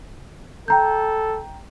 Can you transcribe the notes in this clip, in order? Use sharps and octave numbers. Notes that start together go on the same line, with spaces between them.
A4 G5 A#5 G6